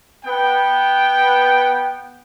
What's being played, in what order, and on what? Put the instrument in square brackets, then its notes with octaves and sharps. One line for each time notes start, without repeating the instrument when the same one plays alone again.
[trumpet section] B3 G5